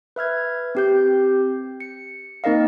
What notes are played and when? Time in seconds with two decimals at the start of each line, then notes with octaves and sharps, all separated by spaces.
0.16 B4 E5 F6 G#6
0.75 C4 G4 G6
1.80 C#7
2.44 A#3 C4 D#4 A#4 D#5 F5